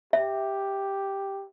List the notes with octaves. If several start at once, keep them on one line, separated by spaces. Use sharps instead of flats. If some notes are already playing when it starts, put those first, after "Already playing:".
G4 E5